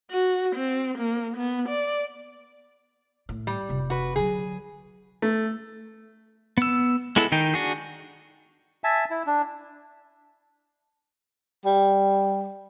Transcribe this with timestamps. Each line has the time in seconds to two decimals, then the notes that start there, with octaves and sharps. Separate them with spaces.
0.11 F#4
0.56 C4
0.98 A#3
1.37 B3
1.69 D5
3.29 A2
3.47 G3
3.69 F1 C3
3.90 F#4 B4
4.16 D3 F#3 G#4
5.22 A3
6.57 B3 E6
7.16 G#3 B3 E4 A4
7.32 D#3 D#4 G5
7.54 D4 F#4 G#4
8.84 E5 G#5 A5
9.10 E4
9.26 D4
11.65 G3